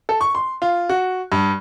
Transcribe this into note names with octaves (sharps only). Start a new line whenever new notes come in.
A4
C#6
C6
F4
F#4
G2